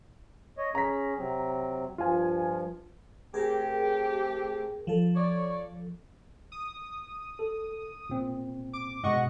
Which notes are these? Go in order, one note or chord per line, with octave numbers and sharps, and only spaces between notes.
C#5 D#5
C#4 G#4 A#5 B6
C3 F#3 C4
G2 F3 F4 G#5
A3 C4 G4 G#4 A#4
F3 A4
C#5 D5
D#6
A4
A#2 C4
D6
G#2 B2 D#5 F#5 C#6